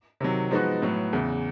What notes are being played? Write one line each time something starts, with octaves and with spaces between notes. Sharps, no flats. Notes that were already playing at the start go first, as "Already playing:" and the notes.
C3 D#3 F#3
F3 G#3 B3 D#4 F#4
A2 F#3 B3
E2 C#3 E3